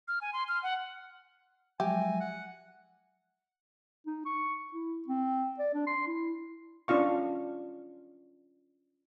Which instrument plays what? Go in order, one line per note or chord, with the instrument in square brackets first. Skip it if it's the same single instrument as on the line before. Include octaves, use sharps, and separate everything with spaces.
[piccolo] F6
G#5
C6
F6
F#5
[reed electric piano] F3 F#3 G#3 [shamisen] G4 [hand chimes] E5 [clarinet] G#5
[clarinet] F#5
D#4
C#6
E4
C4
D5
D4
C6
E4
[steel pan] C#4 D4 F4 F5 C#6